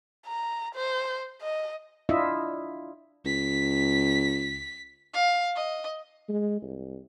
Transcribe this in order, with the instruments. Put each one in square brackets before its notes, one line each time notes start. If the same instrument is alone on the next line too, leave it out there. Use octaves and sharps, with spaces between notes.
[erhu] A#5
C5
D#5
[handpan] D4 E4 F4 D#5 E5
[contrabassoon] C#2 [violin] B6
[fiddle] F5
D#5
[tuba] G#3
C2